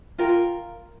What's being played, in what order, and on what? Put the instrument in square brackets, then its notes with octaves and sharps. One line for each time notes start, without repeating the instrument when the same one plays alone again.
[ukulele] F4 A#4 G5